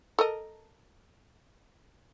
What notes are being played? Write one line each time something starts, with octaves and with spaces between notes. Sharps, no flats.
A4 A#4 D#5